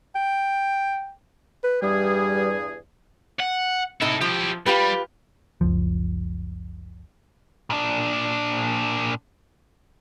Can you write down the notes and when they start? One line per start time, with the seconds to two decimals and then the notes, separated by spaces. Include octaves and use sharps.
0.15 G5
1.64 B4
1.82 E2 G2 G3 G#4
3.40 F#5
4.02 C3 D#4 E4 A4
4.21 F3 E4 G4
4.66 G3 F4 G4 B4
5.61 F#1 C#2 F3
7.70 A#2 D4